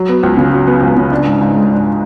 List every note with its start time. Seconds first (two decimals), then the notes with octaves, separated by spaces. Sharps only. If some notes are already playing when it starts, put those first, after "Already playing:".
Already playing: F#3
0.09 B3
0.23 C#2
0.37 C#3
0.53 F#3
0.67 B3
0.82 C#2
0.97 C#3
1.12 D4
1.26 G#2
1.41 G#2
1.55 G#3
1.70 D4